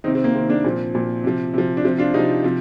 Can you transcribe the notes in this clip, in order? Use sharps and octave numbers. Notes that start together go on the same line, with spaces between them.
C3 D#3 C4 D#4
C4
A#3
C3 D#3 C4
A#3 D4
A#2 F3 C4
A#2 F3
C3 F3
C3 F3
D4
C3 F3 C4
D4 F4
C3 F3 D#4 G4
C3 F3